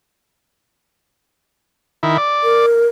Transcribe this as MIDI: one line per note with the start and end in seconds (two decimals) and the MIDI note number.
2.03 2.17 51
2.03 2.17 64
2.18 2.66 74
2.43 2.87 70